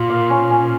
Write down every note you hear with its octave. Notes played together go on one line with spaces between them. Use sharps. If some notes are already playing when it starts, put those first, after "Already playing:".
Already playing: A#2 A#3 F4
F5
C#4
C#4